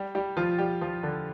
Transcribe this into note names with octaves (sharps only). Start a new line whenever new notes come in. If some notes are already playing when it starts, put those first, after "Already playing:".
Already playing: G3 G4
G3 G4
F3 F4
G3 G4
F3 F4
D3 D4